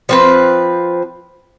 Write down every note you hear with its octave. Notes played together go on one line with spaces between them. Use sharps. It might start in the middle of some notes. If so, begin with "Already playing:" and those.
F3 C4 B4